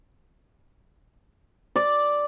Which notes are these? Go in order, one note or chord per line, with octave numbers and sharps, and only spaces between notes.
D5